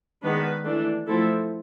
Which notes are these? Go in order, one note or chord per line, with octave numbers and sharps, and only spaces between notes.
D#3 G#3 B3 D4 B4
E3 A3 D4
F3 A3 C4 E4 A4